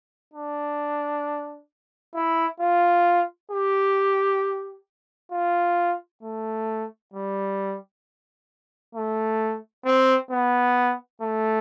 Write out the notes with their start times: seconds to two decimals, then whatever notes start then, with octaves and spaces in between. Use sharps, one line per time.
0.34 D4
2.15 E4
2.60 F4
3.52 G4
5.32 F4
6.23 A3
7.14 G3
8.95 A3
9.86 C4
10.31 B3
11.22 A3